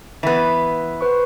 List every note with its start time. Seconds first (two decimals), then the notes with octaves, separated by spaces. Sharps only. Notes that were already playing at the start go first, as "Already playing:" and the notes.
0.23 E3 B3 E5
1.01 B4 C5 C#6